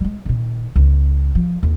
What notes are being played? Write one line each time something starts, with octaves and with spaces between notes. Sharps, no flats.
G3 G#3
A#2 D#3
C#2 D#3
F3
D#2